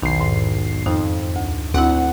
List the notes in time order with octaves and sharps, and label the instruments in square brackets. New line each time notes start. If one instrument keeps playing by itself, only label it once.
[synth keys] B1 C7 [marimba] E2 D#3
[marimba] G#2
[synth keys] F2 [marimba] D#4
[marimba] D2
[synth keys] D2 F#5 [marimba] C4 E4